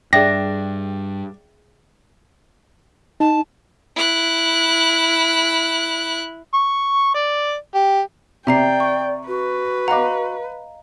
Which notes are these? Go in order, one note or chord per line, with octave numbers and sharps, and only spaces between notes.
G2 D4 G#4 E5 G5 A#6
D#4 A5
E4 F#6
C#6
D5
G4
C3 D5 E5 G5 A#5 C7
C#6
F#4 B4
D#5 F5 F#5 A#5 D6